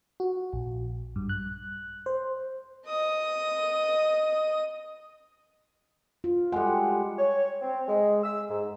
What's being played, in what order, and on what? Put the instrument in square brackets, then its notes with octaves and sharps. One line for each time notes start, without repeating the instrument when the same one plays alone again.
[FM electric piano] F#4
A#1
G2
F#6
C5
[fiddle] D#5 D#6
[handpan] F4
[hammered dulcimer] G3 G#3 [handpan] A4 F#5
[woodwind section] C#5
C4
G#3
E6
G#2